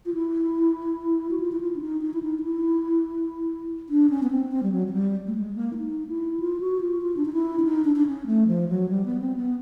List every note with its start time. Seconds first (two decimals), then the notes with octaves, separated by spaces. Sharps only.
0.06 F4
0.14 E4
1.31 F#4
1.40 F4
1.52 E4
1.61 F4
1.76 D4
1.81 D#4
2.02 D#4
2.14 E4
2.22 D#4
2.39 D#4
2.43 E4
3.89 D4
4.10 C#4
4.23 B3
4.31 C4
4.52 C4
4.63 G3
4.72 F#3
4.87 F#3
4.93 G3
5.27 A3
5.35 G#3
5.55 A#3
5.73 E4
5.77 D#4
6.08 E4
6.40 F4
6.60 F#4
6.81 F4
7.02 F4
7.17 D4
7.25 D#4
7.33 E4
7.59 D4
7.64 D#4
7.84 D4
7.96 D4
8.06 C#4
8.26 A3
8.47 F3
8.69 F#3
8.89 G3
9.05 B3
9.20 C4
9.36 B3